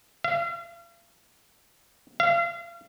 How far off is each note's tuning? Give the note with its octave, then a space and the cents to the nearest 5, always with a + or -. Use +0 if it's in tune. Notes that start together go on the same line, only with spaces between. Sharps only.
F5 -40
F5 -35